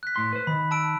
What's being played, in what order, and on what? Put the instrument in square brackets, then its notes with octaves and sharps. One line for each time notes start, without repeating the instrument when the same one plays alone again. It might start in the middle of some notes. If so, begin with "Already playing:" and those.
[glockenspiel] F#6 B6
[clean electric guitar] A2 C6
B4 C5
[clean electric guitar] D#3 [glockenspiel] B5
[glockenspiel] A5 E6 D7